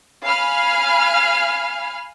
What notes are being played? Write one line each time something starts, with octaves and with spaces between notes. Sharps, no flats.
F5 G#5 B5 F6